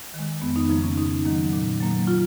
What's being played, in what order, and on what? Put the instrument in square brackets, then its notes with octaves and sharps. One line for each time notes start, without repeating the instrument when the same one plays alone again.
[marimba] D#3 G#3
F2 B3
D#4
C#3 F3 A#3 D#4
C#4
G#2 D#4
D#3 F#3 A#3
A#2
F#3 A#3
F4